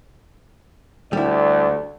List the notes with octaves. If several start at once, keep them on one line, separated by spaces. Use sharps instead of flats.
D2 G3 E4 D5